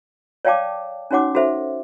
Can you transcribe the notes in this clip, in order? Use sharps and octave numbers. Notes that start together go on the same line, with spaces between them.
C#5 D5 F5 G5 A5 D6
C#4 D#4 F#4 C#5 F#5 D6
F#4 A4 C5 E5